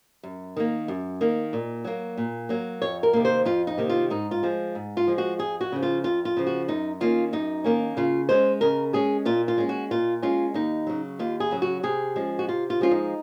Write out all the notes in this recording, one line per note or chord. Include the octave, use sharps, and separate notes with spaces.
F#2
D#3 A#3
F#2
D#3 A#3
A#2
F#3 A#3
A#2
F#3 A#3
F2 C#5
A#4
C3 D#3 A#3
C5
F2 F4
D#4
C3 D#3 A#3
F4
G#2 D#4
F4
F3 G#3
G#2
F4
F3 G#3
F#4
F2 G#4
F#4
C#3 F3
F4
F2 F4
F4
C#3 F3
F#4
F#2 D#4
D#3 A#3 C#4 F4
F#2 D#4
D#3 A#3 C#4
C#3 F4
G#3 C#4 C5
C#3 A#4
G#3 C#4 G#4
A#2 F4
F4
G#3 C#4
F#4
A#2 F4
G#3 C#4 F4
D#2 D#4
C#3 F#3
D#2 F4
G#4
C#3 F#3
F#4
C3 G#4
F3 G#3 C#4
F#4
C3 F4
F4
F3 G#3 C#4 F4
D#4